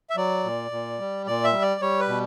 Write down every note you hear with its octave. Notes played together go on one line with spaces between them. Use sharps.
E5
F#3 D5
A#2
A#2
G3
A#2 D5
E5
G3
D5
G3 C#5
B4
B2